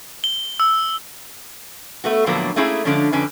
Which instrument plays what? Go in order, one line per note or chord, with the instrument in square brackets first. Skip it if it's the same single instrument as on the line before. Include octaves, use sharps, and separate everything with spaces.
[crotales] G7
E6
[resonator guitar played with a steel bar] A3 B3 F#4
A2 D3 F3 F#3 A#3 B3
A3 A#3 C#4 E4 G#4
D3 F3 G#3 C#4 D4
F2 D3 C#4 D4 B4